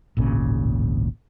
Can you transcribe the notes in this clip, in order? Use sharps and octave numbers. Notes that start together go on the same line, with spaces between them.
D1 G#1 A#2 C#3